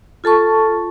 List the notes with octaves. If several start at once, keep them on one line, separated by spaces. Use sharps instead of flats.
F4 A4 A5 C#6